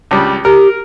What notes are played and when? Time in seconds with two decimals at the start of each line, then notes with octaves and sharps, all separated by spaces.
0.11 C#2 G3
0.45 G4 A#4